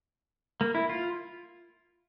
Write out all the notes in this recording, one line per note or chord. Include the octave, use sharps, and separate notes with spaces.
A#3
E4
F4